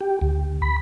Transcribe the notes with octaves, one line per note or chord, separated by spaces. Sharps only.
G4
D2
B5